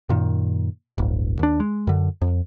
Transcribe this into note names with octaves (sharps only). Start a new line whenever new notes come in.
F#2 A#2 D#3
D1 G1
D#2 D4
G#3
F#2 D3
F2